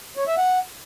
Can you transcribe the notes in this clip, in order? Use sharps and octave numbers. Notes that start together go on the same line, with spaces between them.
C#5
E5
F#5